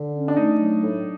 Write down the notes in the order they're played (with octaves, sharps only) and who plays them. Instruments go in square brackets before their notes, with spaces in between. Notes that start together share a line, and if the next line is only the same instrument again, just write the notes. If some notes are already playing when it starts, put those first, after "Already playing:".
Already playing: [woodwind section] D3
C#4
[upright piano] D4
[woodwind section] A3 [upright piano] D#4
[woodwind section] F#3
A2